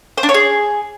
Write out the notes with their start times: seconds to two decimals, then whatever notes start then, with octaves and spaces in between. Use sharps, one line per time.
0.18 C5
0.23 D4
0.29 C#5
0.34 G#4